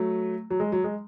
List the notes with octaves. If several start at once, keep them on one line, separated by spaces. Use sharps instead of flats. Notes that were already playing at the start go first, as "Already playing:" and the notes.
Already playing: F#3 A3
F#3
G#3
F#3
G#3